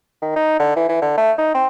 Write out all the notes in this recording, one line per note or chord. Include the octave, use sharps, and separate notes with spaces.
D#3
D#4
D3
E3
E3
D3
A3
D#4
C4